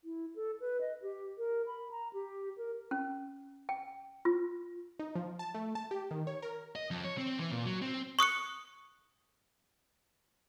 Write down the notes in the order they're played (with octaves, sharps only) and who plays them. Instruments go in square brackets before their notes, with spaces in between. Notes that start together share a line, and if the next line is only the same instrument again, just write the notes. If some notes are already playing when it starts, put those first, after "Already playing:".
[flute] E4
A4
B4
D#5
G4
A#4
B5
A#5
G4
A#4
[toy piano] C#4
G5
F4
[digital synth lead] D#4
F3
A5
A3
A5
G4
D#3
C#5
A#4
[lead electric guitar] D#5
F2
C#5
C4
E3
A#2
F#3
C4
[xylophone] C#6 D#6 F#6 C#7